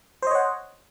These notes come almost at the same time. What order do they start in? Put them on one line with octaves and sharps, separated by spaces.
C5 D#5 C#5 F#5